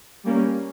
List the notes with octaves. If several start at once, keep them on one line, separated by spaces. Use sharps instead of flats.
G3 A#3 C#4